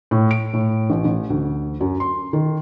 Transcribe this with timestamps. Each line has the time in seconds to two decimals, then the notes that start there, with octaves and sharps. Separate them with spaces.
0.11 A2
0.31 D7
0.53 A2
0.90 A1
1.05 A1
1.30 D2
1.80 F#2
2.00 C6
2.33 D#3